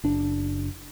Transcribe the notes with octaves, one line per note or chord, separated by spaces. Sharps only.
F#1 D4